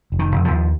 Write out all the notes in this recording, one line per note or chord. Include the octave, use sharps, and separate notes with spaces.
F1
D#3
F1
F3
D#2